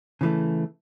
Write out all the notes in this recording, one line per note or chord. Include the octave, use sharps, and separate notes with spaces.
C#3 E3 A3